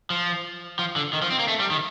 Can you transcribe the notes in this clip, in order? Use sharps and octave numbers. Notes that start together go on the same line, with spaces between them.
F3
F3
D3
D#3
F3
C4
A#3
A3
G3
D#3